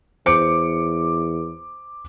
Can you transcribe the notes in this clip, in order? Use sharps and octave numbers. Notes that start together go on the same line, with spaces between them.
E2 C5 D6 C#7 D7